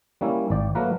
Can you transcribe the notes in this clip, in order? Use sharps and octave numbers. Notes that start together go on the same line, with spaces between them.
G3 A#3 C#4 E4
G#1 D5 G5
F#3 A3 A#3 A#4 B4